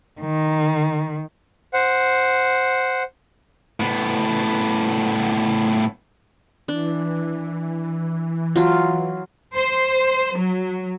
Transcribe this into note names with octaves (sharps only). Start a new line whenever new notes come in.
D#3
C5 F#5
A2 B3
E3 D4
F#3 F4
C5
F#3